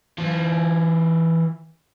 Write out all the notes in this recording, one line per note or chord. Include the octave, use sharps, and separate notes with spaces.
E3 F4